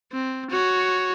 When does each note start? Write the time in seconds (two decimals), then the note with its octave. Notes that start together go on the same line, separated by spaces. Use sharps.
0.12 C4
0.51 F#4 C#5